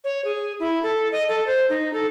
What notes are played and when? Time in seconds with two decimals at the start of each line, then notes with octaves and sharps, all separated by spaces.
0.04 C#5
0.25 G#4
0.60 E4
0.83 A4
1.12 D#5
1.28 A4
1.47 C5
1.70 D#4
1.93 A4